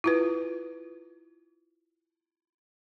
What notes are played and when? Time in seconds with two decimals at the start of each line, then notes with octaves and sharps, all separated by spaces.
0.04 E4 F4 B4